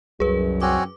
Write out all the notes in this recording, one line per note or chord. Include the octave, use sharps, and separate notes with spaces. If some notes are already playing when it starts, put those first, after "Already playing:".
C2 F#2 G#4 B4
C4 C#4 F#4 D6